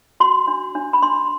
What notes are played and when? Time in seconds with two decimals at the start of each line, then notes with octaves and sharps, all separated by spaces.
0.20 F#4 C6
0.48 D4
0.75 D4
0.93 B5
1.02 D4 C6